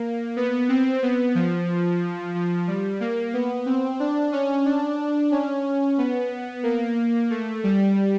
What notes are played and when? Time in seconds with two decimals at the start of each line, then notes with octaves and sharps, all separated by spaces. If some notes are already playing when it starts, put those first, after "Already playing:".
Already playing: A#3
0.36 B3
0.69 C4
1.03 B3
1.35 F3
2.34 F3
2.67 G3
3.00 A#3
3.34 B3
3.66 C4
4.00 D4
4.32 C#4
4.65 D4
5.31 C#4
5.98 B3
6.63 A#3
7.30 A3
7.64 G3